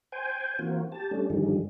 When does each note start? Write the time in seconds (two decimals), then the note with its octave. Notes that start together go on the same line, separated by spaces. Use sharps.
0.12 C5 G5 G#5
0.59 E3 A#3 C4 F4 F#4
0.92 G4 A5
1.11 G3 A3 C#4 D4
1.30 G2 D3 D#3 F3 G3 G#3